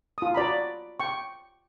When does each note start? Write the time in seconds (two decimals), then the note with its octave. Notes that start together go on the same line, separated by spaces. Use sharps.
0.18 F4 D#6
0.34 F#4 D5 A#5 B5
1.00 G5 C#6